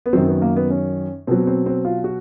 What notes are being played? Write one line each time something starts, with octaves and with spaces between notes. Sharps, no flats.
B3
F#2 D#3 F#3 C4
B3
A#3
B3
C#4
B2 F#3 C4
C4
C4
F4
F#4